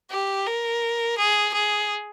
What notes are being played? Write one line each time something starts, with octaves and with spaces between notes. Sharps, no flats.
G4
A#4
G#4
G#4